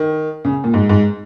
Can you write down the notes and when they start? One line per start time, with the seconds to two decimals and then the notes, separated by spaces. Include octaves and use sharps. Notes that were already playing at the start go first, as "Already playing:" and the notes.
Already playing: D#3
0.45 C#3
0.64 A#2
0.74 G#2
0.89 G#2